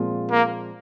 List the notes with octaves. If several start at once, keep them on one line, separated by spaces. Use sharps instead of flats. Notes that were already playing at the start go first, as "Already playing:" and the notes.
Already playing: A#2 F3 G#3 C4 F4
A#3